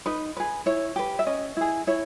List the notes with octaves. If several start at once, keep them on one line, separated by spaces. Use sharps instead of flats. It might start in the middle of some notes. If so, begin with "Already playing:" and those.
D#4 B4
G#4 B4
E4 C#5
G4 B4
E5
C#4 D#5
E4 G#4
E4 C#5